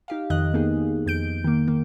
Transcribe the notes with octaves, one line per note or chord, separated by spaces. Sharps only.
D#4 G4 F5
F2 D#3 D#5 F#6
A#3 B3 D#4 G#4
F2 G6 D7
D#3 A#3
D#3 A#3